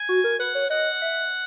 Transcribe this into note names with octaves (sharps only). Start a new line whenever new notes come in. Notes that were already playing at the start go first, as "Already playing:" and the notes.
Already playing: G#5
F#4
A#4
B4 F#5
C#5
D#5 F#5
E5